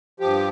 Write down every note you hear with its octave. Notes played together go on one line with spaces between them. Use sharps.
G2 F3 G4